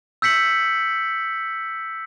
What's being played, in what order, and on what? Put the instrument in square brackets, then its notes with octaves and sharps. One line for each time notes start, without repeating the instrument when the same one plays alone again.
[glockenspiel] E6 G6 B6 C#7 F#7